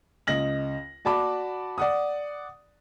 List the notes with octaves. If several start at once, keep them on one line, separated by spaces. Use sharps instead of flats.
C#2 D#5 A#6 F#7
F#4 D5 A5 B5 D6
D5 F#5 D#6